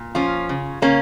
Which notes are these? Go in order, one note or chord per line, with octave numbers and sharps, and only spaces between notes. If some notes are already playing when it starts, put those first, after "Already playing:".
Already playing: A#2
F3 C#4 F4
C#3
C#3 A#3 C#4